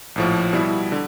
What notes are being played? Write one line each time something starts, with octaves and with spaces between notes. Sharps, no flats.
A#1 A2 F3
B2 G3 B3 E4
D3